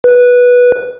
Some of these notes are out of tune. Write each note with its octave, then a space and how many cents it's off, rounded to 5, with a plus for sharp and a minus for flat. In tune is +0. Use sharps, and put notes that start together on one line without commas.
B4 -10